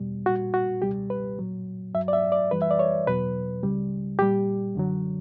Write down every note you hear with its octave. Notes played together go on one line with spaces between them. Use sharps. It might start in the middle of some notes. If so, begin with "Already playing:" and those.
Already playing: E2 B2 G3
A#2 G3 F#4
F#4
C#2 B2 G3 G4
B4
A#2 F#3
G2 F#3 E5
D5
E5
D5
F#2 E3 G3 B4
E5
D5
C#5
E2 B2 F#3 B4
C#2 C#3 G3
A#2 G3 G4
F#2 D3 F#3